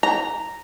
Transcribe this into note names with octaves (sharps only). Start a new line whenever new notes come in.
A#5